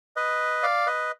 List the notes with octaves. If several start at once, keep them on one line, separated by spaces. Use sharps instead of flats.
B4 D#5
D5 F5
B4 D#5